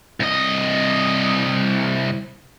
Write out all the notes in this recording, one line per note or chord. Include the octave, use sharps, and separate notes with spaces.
C2 D#5